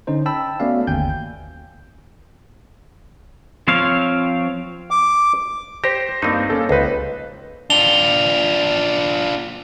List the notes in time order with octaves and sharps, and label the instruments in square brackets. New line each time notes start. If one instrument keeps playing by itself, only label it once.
[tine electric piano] D3 C#4 D#4 C5
G5 A5 B5 E6
A3 B3 C#4 F#4 D5 F5
G1 D#2 G5 G#5 G6
[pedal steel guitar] F3 C4 C5 C#5 F5
[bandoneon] D6
[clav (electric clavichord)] G4 [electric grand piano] C5 A#6
[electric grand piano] G2 A#3 [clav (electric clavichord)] C4 D#4
[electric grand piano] A#3 C#4 A4
[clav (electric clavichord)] C#2 D#4 [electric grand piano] B4 C5
[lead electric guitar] D4 F4 [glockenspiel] F7 G7